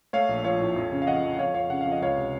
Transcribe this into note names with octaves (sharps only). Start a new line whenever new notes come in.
A3 C#5 F5
A#1
F3 C#5 F5
A2
F2
C#3
F5
F2 D#5 F#5
F2
F2 C#5 F5
F2 C#5 F5
C#3 F#5
F2 F5
D#5
C#2 C#5 F5
C3